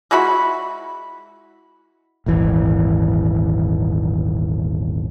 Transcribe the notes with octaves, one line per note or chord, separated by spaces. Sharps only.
G#3 E4 F#4 B5
D#1 G#1 E3